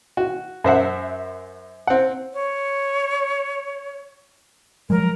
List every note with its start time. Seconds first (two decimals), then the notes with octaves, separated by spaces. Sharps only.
0.17 F#4
0.64 F#2 C5 E5 F#5
1.87 C4 F#5
2.34 C#5
4.90 F3 F#3 G#3 A#4